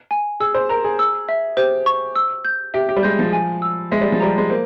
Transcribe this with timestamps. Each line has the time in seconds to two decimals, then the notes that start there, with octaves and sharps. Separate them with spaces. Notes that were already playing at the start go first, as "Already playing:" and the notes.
0.11 G#5
0.40 G#4 E6
0.54 C5
0.69 A#4 A#5
0.84 G#4
0.99 E6
1.29 E5
1.57 G4 C5
1.86 C#6
2.16 E6
2.45 G6
2.74 G4 E5
2.89 G4
2.96 G3
3.03 G#3 G6
3.19 F3
3.33 G#5
3.62 E6
3.91 G#3 E5
4.01 G3
4.12 F3
4.20 G3 A#5
4.38 G#3
4.50 A#3 C5